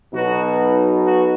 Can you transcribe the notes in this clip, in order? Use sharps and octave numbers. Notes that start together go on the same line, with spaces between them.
B1 B2 F#3 B3 D#4 F#4
F#4